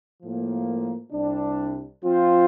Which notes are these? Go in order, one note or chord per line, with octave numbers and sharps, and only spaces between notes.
A2 F3 A#3
C2 C3 G3 D4
F3 C4 F4 C5